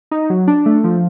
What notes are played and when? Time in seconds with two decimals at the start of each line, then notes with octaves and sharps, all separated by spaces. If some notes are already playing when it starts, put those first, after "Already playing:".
0.11 D#4
0.30 F#3
0.47 D4
0.66 A3
0.84 F3